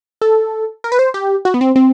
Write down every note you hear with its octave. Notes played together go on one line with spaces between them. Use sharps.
A4
A#4
B4
C5
G4
F#4
B3
C4
C4